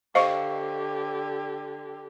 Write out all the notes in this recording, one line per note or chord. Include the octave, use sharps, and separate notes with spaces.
D3 G4 C5 D#5 F5 C#6